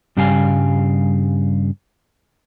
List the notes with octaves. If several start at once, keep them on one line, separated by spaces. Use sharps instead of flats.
G2 C#3 G3 G4 F5 G#5